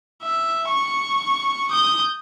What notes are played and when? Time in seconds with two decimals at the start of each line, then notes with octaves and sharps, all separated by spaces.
0.23 E5
0.68 C#6
1.71 D#6 G6